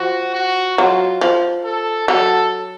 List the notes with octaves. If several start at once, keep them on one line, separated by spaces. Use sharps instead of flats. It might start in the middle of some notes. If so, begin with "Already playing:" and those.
Already playing: F3 F#4
F#4
F#3 F4
F3
A4
F#3 A4